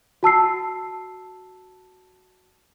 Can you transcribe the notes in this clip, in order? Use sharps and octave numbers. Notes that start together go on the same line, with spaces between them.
F#4 A5 E6 C7